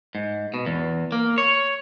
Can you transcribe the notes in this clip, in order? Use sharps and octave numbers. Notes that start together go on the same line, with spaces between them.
G#2
B2
E2
A#3
C#5